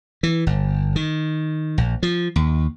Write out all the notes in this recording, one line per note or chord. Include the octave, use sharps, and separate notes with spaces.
E3
G1
D#3
A#1
F3
D#2